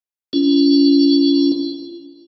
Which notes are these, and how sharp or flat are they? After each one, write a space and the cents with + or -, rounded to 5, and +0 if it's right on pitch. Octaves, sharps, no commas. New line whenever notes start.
C#4 +30 F4 -35